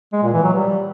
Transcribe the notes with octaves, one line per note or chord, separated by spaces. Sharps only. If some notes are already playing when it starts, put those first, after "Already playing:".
G#3
A#2
E3
F#3
G3